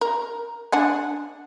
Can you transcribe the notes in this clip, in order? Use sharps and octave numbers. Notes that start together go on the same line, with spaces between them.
A#4
D4 F#5 G#5